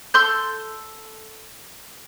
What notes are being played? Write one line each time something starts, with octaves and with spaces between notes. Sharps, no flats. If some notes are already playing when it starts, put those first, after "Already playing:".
A4 C6 G6